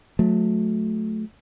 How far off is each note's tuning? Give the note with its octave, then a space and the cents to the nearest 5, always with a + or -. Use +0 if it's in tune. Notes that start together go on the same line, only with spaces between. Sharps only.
F#3 -35 A3 -20